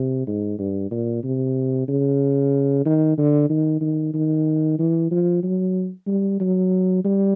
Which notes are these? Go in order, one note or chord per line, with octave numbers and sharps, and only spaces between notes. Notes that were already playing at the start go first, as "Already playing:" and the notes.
Already playing: C3
G#2
G2
A#2
C3
C#3
D#3
D3
D#3
D#3
D#3
E3
F3
F#3
G3
F#3
G3